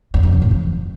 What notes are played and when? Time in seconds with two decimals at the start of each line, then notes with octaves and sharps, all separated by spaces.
0.14 E2
0.23 F2
0.32 C#3
0.42 A2
0.51 E3